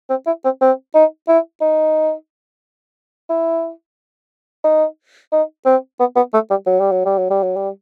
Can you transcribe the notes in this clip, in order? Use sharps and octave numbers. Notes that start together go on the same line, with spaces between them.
C4
E4
C4
C4
D#4
E4
D#4
E4
D#4
D#4
C4
B3
B3
A3
G3
F#3
G3
F#3
G3
F#3
G3
F#3
G3